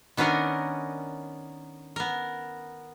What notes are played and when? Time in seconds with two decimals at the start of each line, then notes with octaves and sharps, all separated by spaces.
0.17 D#3 B3 C#4 D4 A#4 D#5
1.96 B3 A#4